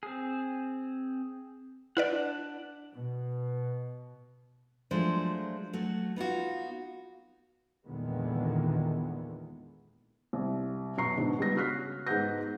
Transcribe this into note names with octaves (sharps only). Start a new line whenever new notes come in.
C4 G#4
D4 E4 B4 D5 F#5
B2
F3 F#3 G#3 A3 D4 C5
F#3 A3 F#4
B3 D#4 F4 F#4
E2 A#2 D3 D#3 G#3 B3
C2
F#2 B2 A#5 C#6 C7
G#2 B2 D3
C#2 G3 B3 A#6
C#3 F#4 F6 F#6 B6 C7
G#2 G#3 B3 F#5 G6 A#6